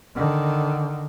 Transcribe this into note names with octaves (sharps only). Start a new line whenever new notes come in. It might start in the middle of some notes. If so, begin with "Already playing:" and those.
D3 D#3